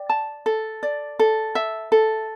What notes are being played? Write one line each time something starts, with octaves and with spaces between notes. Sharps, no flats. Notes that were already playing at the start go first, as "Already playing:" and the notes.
Already playing: D5 G5
A5
A4
D5
A4
E5
A4